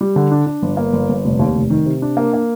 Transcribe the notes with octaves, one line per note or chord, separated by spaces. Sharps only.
G3
D3
D4
D4
G1
A#3
G1
G1
F1
D#2
F1
D#3
C3
D4
A#3
A#3